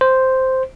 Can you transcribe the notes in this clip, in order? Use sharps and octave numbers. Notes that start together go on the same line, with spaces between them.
C5